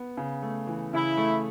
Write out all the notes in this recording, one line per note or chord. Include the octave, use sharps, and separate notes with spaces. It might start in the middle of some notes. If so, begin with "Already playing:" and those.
Already playing: B3
C#3
A3
E3
C#3 E4
A3